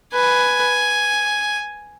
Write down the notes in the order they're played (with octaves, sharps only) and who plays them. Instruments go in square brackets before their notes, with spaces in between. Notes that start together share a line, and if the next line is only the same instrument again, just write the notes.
[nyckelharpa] B4 [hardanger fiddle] G#5